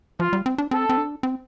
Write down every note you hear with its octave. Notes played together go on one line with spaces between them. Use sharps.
F3 F4
G3
C4
D4
C4 A4
C4
D4
C4